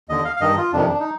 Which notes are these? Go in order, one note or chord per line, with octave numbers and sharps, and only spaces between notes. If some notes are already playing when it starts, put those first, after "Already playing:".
D#2 D3 D#5
F5
F5
G2 D#3 D#5
F4
F2 C3 D#3 D4
D4
D#4